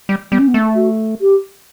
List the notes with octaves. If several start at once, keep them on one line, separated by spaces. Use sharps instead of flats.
G3
G3 B3
C#4
B3
A3
F#4
G4